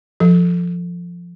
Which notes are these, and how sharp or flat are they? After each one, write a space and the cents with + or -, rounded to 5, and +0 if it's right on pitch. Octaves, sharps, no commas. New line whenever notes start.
F3 +0 A4 +0